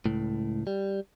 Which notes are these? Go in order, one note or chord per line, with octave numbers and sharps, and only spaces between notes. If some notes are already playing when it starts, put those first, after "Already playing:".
C#2 A2
G3